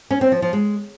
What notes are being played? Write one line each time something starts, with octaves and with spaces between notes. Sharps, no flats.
C#4
C4
F3
F3
G#3